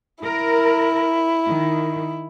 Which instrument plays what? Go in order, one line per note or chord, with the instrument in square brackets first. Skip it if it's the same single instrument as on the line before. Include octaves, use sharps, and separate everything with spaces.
[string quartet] E4 [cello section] A#4
[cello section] D#3